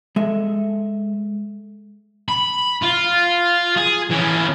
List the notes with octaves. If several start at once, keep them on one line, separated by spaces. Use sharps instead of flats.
G#3 A4 E5
B5
F4
G#4
E3 C#4